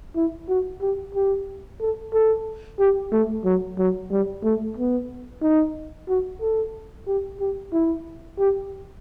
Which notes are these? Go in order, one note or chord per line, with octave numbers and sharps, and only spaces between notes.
E4
F#4
G4
G4
A4
A4
G4
A3
F#3
F#3
G3
A3
B3
D#4
F#4
A4
G4
G4
E4
G4